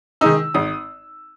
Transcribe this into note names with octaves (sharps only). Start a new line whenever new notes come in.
D#3 G#3 D#4 E6
G#1 D#6